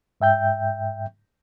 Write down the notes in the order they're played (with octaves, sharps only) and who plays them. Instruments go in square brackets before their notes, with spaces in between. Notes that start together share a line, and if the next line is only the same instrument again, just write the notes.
[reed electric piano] G#2 E5 G5 G6